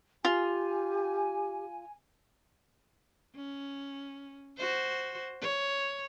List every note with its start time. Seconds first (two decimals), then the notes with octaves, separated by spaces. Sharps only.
0.25 F4 G4 G#5
3.36 C#4
4.58 F#4 C5
5.41 C#5